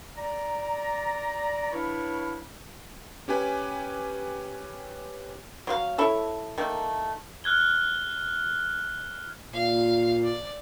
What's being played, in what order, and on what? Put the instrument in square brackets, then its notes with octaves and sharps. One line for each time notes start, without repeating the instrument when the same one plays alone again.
[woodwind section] D5 A#5
D4 E4 B4 C#5 F5 B5
[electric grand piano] C#4 G4 B4 G#5
[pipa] F#3 C5 F5
E4 A4 C#5
D#3 A3 A#3
[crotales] F6 F#6 G#6 G7
[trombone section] A#2 [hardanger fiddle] F5
[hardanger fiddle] D5